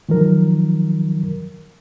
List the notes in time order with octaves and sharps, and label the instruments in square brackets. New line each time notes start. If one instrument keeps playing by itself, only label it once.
[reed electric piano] D#3 F3 F#3 A#4